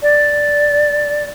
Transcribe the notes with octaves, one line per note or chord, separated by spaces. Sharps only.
D5